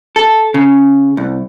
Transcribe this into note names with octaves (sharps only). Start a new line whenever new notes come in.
A4
C#3
C2